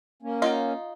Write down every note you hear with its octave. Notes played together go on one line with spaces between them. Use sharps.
A#3 C#4
D#4 F4 D#5 F5 F#5